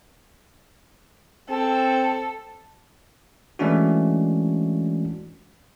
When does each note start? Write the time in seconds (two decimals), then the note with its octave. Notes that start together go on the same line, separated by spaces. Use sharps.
1.50 C4 A4
3.59 E3 G#3 A3 C#4 D4 F#4